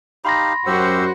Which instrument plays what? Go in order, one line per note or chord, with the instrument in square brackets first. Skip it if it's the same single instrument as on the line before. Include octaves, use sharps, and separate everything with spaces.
[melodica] D#4 G4 F5 [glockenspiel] B5 C6 A#6
[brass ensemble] F#2 C5 [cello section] F#4 [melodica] G4 E6